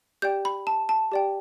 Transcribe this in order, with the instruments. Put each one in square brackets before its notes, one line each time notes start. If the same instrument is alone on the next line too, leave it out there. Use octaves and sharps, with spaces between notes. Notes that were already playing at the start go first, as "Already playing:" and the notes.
[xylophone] G4 D5 G5 G6
B5
A5
A5
G4 D5 G5